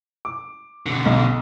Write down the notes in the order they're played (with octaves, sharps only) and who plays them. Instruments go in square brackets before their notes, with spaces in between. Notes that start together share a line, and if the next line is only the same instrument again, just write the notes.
[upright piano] D6
[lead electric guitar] B2 D3
[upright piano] B1